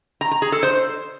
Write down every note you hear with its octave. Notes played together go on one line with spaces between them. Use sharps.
A#5
A#5
G#4
A4
C5